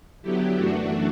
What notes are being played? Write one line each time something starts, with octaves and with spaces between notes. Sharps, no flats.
D3 F#3 B3 E4 G4
F#2 E3 A3 D4 F#4